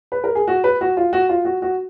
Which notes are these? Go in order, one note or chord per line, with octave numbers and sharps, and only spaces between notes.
B4
A#4
G#4
F#4
B4
F#4
F4
F#4
F4
F#4
F#4